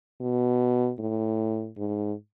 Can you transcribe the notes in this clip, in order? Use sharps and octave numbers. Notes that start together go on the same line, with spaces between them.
B2
A2
G#2